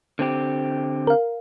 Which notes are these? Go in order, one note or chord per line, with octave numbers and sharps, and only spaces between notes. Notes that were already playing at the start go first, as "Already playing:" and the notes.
D3 C4 G4
A#4 F5